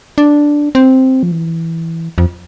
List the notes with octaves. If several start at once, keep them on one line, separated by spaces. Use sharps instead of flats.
D4
C4
F3
E3
F2